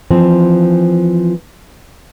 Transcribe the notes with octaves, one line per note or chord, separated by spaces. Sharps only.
E3 F3 C4